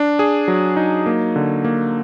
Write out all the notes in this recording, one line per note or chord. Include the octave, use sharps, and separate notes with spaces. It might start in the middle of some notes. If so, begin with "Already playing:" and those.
Already playing: D4
G#4
F#3
D#4
A#3
D3
A#3